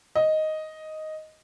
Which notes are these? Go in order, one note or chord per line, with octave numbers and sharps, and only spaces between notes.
D#5